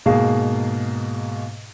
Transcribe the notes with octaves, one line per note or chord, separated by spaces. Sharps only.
G#2 B2 A#3 G#4 F5